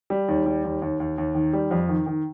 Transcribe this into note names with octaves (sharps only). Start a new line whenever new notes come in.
G3
D#2
G3
D#2
D#2
D#2
D#2
D#3
G3
F2
D#3
D#3